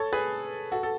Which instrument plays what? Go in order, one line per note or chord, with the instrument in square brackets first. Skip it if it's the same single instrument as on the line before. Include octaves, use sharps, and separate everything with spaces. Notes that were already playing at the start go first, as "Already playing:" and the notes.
Already playing: [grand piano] A4 C#5
G#4 B4
F#4 A4
A4